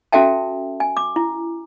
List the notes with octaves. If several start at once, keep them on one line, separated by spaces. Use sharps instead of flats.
C#4 F#4 A4 E5 G5 A5
G#5
D6
E4